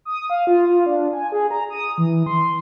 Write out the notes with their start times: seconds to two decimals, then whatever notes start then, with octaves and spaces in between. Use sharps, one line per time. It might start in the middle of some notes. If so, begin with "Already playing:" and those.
0.05 D#6
0.30 F5
0.47 F4
0.69 F4
0.86 D4
1.13 G#5
1.32 G#4
1.51 A#5
1.70 D#6
1.98 E3
2.26 C6